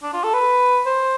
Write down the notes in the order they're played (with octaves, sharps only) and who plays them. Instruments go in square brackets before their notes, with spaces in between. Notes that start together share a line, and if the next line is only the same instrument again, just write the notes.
[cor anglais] D4
F4
A4
B4
C5